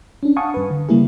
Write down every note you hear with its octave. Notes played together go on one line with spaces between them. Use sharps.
C#4 D4
F5 F#5 G#5 A5 C#6 D#6
G2 B4
D3
C#3 G3 A#3 E4 G#4